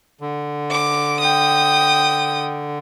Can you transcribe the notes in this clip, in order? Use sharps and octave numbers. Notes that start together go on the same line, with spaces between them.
D3
D6
G5 D#6